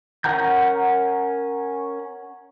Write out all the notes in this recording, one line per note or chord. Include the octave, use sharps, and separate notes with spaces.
C#4 A#4 F#5 A#5 G6